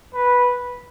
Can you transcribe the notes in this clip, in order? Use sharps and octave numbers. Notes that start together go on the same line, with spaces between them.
B4